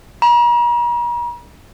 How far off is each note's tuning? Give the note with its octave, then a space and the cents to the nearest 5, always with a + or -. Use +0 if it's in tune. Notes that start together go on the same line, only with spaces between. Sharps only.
A#5 +45